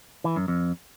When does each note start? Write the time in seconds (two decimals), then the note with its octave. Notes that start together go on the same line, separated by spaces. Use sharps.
0.24 E3
0.36 F#2
0.48 F2